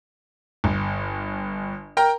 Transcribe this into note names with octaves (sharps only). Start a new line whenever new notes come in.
G1
A#4 G5 A#5